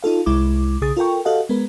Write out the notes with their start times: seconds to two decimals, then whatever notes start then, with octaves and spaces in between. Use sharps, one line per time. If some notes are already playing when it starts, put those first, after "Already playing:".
0.03 D#4 F4 A4 F5
0.26 C2 G#3 E4 D6
0.81 B1 C#3 G#4 D#6 A6
0.97 F4 A4 A#4 G5 C#6
1.25 F#4 G4 A4 D#5 F5 F#5
1.49 G#3 B3 A#4 B4